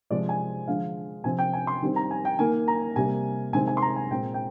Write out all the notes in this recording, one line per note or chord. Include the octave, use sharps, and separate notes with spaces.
C3 F3 G#3 C4 D5
G#5
D3 F3 G#3 F5
C3 F3 C4 G#5
G5
G#5
C6
D#3 G3 C4
A#5
G#5
G5
D#3 A#3 G#5
A#5
C3 G3 A#3 G#5
C3 D#3 G#3 C4 G#5
G#5
C6
A#5
G#5
A#2 G#3 C4 G5
G5